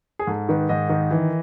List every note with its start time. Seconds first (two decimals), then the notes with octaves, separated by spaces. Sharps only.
0.19 G#4
0.27 G#2 A4
0.49 D#3 B4
0.69 G#2 D#5
0.89 D#3
1.11 E3